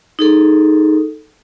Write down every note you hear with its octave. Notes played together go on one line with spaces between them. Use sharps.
D#4 G#4 A4